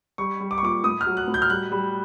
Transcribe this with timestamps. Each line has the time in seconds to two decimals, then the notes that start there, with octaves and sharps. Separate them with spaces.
0.18 G3 C#6
0.40 G3
0.51 D6
0.58 C#6
0.63 A#2 D6
0.84 A2 D#6
1.01 F6
1.06 F#3
1.17 F#6
1.28 A2
1.34 G6
1.42 F6
1.50 G3 F#6
1.72 G3